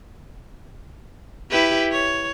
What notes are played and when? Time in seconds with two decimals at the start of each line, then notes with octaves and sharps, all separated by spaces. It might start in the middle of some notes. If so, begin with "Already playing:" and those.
1.51 E4 G4 B4
1.92 C#5